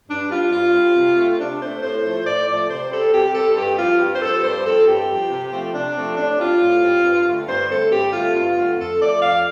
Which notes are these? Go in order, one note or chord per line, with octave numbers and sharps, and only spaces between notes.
G2 D4
G3 C4 F4
G2 F4
G3 C4
C3
A3 C4
C3 D4
A3 C4 C5
A2 C5
F3 A3
A2 D5
F3 A3 D5
C3 C5
G3 C4 A4
C3 G4
G3 C4 A4
G2 G4
F3 C4 F4
G2 G4
C5
F3 C4 A4
G2 C5
F3 C4 A4
G2 G4
F3 C4
C3
F3 A3 C4
C3 D4
F3 A3 C4
A2 D4
G3 C4 F4
A2
G3 C4
G2
D3 A3 C4
G2 C5
D3 A3 C4 A4
G2 G4
D3 A3 C4 F4
G2 F4
D3 A3 C4
F2 A4
F3 A3 D5
F2 F5